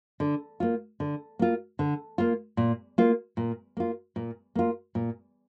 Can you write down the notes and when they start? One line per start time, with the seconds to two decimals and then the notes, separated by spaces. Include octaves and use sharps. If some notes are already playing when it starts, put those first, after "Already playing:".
0.20 D3
0.60 A#3 F4
1.00 D3
1.39 A#3 F4
1.79 D3
2.18 A#3 F4
2.57 A#2
2.98 A#3 F4
3.37 A#2
3.77 A#3 F4
4.16 A#2
4.55 A#3 F4
4.95 A#2